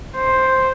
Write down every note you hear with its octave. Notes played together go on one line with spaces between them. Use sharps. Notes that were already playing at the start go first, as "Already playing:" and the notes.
C5